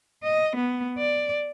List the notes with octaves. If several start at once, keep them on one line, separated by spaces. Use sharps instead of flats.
D#5
B3
D5